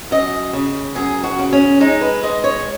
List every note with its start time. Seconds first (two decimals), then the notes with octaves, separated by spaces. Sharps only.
0.11 F#2 D#5
0.53 C#3
0.95 F#2 G#4
1.24 F#4
1.39 C#3
1.53 C#4
1.80 G#3 D#4
2.01 B4
2.23 G#3 D#5
2.44 C#5